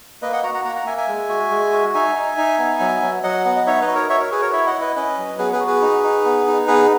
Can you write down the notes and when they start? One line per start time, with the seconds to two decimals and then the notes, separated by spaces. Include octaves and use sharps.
0.22 A#3 B4 D#5
0.32 D#5 F#5
0.43 F#4 F#5 A#5
0.54 F#5 A#5
0.64 A#3 F#5 A#5
0.75 F#5 A#5
0.86 A#3 E5 G#5
0.97 E5 G#5
1.08 G#3
1.29 F#4
1.51 G#3
1.72 F#4
1.94 D#4 E5 G#5
2.15 D#4
2.38 D#4
2.58 B3
2.80 F#3
3.02 F#3
3.23 F#3 D#5 F#5
3.45 B3
3.56 D#5
3.67 D#4 C#5 E5
3.81 B4 D#5
3.88 F#4
3.95 A#4 C#5
4.09 F#4 C#5 E5
4.20 A#4 C#5
4.31 F#4 G#4 B4
4.42 A#4 C#5
4.52 E4 C#5 E5
4.67 D#5 F#5
4.74 E4
4.81 B4 D#5
4.96 C#4 B4 D#5
5.17 F#3
5.38 B3 G#4 B4
5.53 G#4 B4
5.60 F#4
5.67 G#4 B4
5.81 D#4
6.04 D#4
6.25 B3
6.47 D#4
6.68 B3 G#4 B4